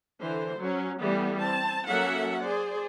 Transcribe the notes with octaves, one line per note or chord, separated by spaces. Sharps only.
D3 E3 C5
F#3 C#4
E3 G3 A3 B3
C4 A5
F#3 A#3 C#4 A4 E5 F#5
G#4 C5 D5